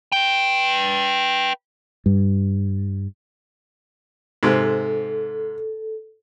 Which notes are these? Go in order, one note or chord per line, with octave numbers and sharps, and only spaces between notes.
B4 G5
G2
G#2 C3 A4